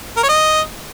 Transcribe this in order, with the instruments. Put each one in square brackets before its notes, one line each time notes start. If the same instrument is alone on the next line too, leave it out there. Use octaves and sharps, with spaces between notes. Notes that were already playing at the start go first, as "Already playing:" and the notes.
[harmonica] A#4
C#5
D#5